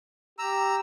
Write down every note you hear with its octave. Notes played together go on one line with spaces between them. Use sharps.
G4 A#5 E6